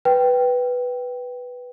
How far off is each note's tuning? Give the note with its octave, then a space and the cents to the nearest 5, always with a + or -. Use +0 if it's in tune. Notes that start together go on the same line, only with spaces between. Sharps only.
B4 +0 G5 -5